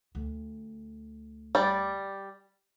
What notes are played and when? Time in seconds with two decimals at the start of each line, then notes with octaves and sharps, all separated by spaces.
0.15 D2
1.55 G3 D5